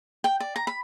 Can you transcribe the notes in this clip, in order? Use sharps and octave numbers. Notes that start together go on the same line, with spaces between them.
G5
D5
A#5
B5